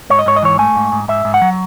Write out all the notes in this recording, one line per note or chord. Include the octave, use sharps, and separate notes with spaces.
G#2 C#5
D#5
G#2 C#5
D#5
E3 C#5
A3 G#5
G#2
G#2
G#2 E5
G#2
F#5
F#3